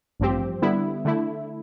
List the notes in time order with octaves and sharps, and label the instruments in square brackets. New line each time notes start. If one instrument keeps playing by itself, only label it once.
[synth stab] A1 G2 F3 C4 G4
D3 G3 B3 E4
D3 A3 E4